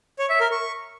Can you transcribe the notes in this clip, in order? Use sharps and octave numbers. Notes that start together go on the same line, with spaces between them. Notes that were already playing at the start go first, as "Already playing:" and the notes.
C#5
E5
A#4
C#6